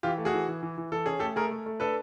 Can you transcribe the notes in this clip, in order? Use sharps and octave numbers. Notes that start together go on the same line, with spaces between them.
E3 F4 G4
A3
F#4 G#4
E3
E3
E3
E3
E3 A4
C#4 G#4
A3 G4 A4
A3 G#4 A#4
A3
A3
D4 A4 B4